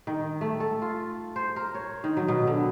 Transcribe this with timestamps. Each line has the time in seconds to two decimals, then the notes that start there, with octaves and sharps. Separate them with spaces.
0.07 D#3
0.41 A3
0.60 A4
0.82 F4
1.36 C5
1.56 A#4
1.75 C#5
2.04 D#3
2.17 F#3
2.28 B2
2.47 D3